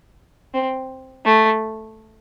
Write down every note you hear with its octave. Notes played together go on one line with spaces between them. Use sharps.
C4
A3